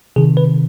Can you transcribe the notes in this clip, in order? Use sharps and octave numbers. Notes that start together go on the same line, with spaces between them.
C3 D#3 G#4
B4